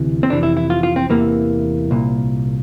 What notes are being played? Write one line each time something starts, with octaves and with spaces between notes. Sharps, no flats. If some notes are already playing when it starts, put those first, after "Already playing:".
Already playing: D2 C3 E3
C4
F2 C3 E3 D4
E4
E4
F4
F4
C4
E2 C3 E3 A#3
C2 A#2